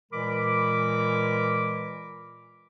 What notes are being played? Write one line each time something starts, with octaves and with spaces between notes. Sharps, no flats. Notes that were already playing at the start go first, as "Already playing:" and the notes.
A#2 E3 G#3 A#4 B5 D6